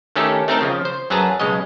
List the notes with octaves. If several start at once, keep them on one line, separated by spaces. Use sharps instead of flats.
D#3 A3 C#4 D#4 G4 A4
A3 C4 D#4 A#4 G5 A5
C#3 F3
C5
F#2 F#3 G#4 B4 A5 A#5
B1 C#3 G#3 C#5 D#5